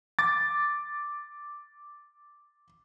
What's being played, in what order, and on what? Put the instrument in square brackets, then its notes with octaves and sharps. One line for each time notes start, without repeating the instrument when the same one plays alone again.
[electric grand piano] D6 A6